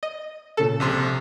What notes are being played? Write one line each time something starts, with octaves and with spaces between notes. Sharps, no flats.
D#5
A#2 C#3 A4
A#1 C3 C6